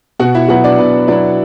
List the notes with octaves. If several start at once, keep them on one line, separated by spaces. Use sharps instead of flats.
B2 F#4 F#5
E4 E5
F#3 B3 E4 F#4 F#5
D4 D5
B2 B3 B4
F#3 B3 D4 E4 D5